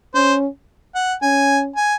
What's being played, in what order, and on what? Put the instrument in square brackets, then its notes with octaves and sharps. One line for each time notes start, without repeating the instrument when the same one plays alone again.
[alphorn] C#4 [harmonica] C5
[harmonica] F#5
[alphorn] C#4 [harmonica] G#5
[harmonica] G#5